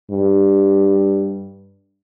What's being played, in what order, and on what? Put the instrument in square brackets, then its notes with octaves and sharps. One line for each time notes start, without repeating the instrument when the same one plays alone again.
[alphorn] G2